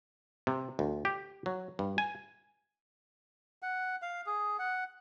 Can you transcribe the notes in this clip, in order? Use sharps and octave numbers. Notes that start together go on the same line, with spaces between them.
C3
D2
G4
F#3
G2
G#5
F#5
F5
G#4
F#5